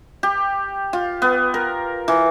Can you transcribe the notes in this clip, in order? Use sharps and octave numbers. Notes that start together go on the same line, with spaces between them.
G4
F4
B3
A#4
E3